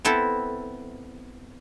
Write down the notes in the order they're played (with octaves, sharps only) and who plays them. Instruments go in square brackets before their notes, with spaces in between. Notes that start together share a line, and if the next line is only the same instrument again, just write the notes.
[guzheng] B3 C4 E4 A4